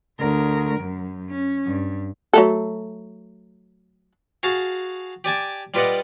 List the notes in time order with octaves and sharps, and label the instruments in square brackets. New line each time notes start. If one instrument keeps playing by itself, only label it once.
[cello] D2 A#4
F#2
C#4
G2
[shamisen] F#3 A3 A4
[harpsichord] F#4 G#4 F5 A5
G4 D5 G#5 A5
G3 F4 B4 D5 D#5 F#5